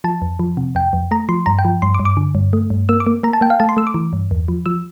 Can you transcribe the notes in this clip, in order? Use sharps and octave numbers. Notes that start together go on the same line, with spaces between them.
F3 A5
F2
F3
C3
F2 G5
F2
A3 A#5
F3 C6
G2 A#5
G5
F3
G2 C6
D6
G2
D6
D3
G2
A3
G2
A#3 E6
D6
A#3
A#3 A#5
A5
A#3 G5
F5
A3 A5
C6
A3 E6
D6
E3
G2
E2
F3
F3 E6